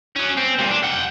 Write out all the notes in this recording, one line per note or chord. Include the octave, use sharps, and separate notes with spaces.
F#3 C#4
C4
G2 A#2
D4
F#5 G5